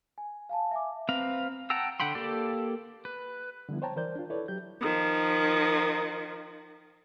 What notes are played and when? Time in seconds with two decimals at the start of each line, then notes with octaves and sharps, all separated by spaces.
0.18 G#5
0.49 F5 G#5 A5
0.71 E5 G#5 D6
1.09 C4 B4 F5 A#5
1.70 F#5 G5 A5 A#5 E6
2.00 D3 F#5 G5 B5 C6
2.15 A#3 G4 A4 D5 A5
3.05 B4
3.69 D3 F3 G3 B3 E4
3.82 C5 C#5 G5 A5 A#5
3.96 E3 A#4 C5 D5 G6
4.16 D4 F4
4.30 E4 A4 B4 C#5 D5
4.48 F#3 G4 G6
4.81 D#3 F3